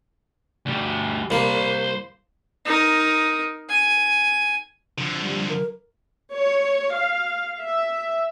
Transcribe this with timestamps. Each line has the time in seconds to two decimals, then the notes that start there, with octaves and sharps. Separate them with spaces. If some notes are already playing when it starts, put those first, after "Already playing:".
0.66 D2 G3
1.30 C2 A#3 C5 B5
2.65 D#4 A#4
3.69 G#5
4.98 D3 F3
5.22 G3
5.49 A#4
6.34 C#5
6.95 F5
7.60 E5